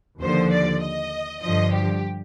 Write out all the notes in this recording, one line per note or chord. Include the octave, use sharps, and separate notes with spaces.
D#2 D3 F3 C5
D5
D#5
G2 D3 F3 D#5
G4